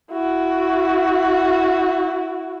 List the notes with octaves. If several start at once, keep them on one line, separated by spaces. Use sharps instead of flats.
E4 F#4